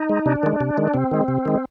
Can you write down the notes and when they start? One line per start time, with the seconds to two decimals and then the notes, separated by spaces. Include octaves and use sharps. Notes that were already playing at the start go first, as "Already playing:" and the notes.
Already playing: D#4
0.09 G#3
0.26 C3 D4
0.43 D#3 G#3
0.61 C3
0.77 D#3 G#3
0.94 C3 C4
1.11 D#3 G#3
1.28 C3
1.45 D#3 G#3